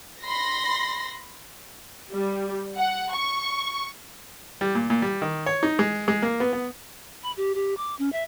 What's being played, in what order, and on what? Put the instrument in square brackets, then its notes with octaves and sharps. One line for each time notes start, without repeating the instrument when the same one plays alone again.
[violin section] B5 C6 A#6
[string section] G3
F#5
C#6
[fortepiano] G3
A#2
A#2
G3
D#3
C#5
D#4
G#3
G#3
A#3
B3
B3
[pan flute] B5
G4
G4
D6
C#4
E5